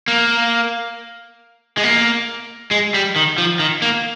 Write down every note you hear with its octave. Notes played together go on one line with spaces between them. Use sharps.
A#3
G#3
A#3
G#3
G3
D#3
F3
D#3
A#3